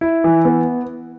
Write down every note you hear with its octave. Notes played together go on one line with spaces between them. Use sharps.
E4
E3
B3